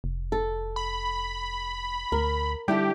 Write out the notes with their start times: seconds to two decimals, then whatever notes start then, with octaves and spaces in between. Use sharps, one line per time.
0.04 F1
0.32 A4
0.76 B5
2.12 D2 A#4
2.68 D3 G3 E4 G4 A4